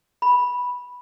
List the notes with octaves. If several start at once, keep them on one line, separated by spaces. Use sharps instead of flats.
B5